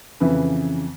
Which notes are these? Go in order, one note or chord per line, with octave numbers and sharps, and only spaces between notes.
F2 C#3 E3 B4